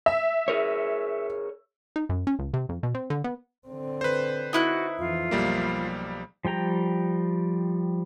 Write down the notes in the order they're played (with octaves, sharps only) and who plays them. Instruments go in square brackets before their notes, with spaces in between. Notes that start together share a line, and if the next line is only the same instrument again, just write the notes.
[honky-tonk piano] E5
[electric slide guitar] G#4 A#4 C#5
[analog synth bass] D#4
F#2
C#4
C#2
C3
F2
B2
C4
D3
B3
[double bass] D3 C4
[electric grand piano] B4 C5
[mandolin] D#4 E4 F#6 [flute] F#4
[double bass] F2 E3 [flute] F4
[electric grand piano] B1 G3 A#3 [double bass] F3
[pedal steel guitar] F3 G3 G5 A#5